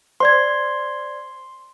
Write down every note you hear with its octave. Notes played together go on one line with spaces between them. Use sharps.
C5 D5 C6 G#6